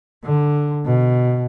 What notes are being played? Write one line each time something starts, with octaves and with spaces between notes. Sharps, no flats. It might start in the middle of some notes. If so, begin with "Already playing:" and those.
D3
B2